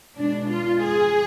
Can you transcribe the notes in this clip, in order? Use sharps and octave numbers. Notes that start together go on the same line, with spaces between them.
B2 G#3 D4
F4
G#4